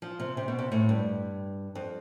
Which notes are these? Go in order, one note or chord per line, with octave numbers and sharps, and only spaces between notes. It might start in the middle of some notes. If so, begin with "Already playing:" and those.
F3
C3
C3
B2
C3
A2
G2
F2